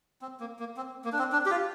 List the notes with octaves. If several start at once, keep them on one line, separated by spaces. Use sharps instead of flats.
C4
A#3
A#3
C4
A#3
D4
C4
D4
G4
F4